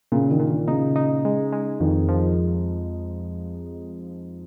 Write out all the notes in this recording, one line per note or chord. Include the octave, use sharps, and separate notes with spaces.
A#2 C#3
D#3
A#2
D#3
C#3 D#4
D#4
G#3
G#3
F2 D#3
F3